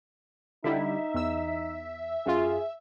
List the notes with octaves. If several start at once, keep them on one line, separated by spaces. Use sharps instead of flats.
D3 G3 D#4 E4 E5
E2 E6
F#2 F4 G#4